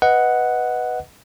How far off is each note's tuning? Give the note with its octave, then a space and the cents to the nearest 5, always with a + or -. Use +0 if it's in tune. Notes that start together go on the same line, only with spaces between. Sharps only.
B4 +0 D#5 +10 F#5 +0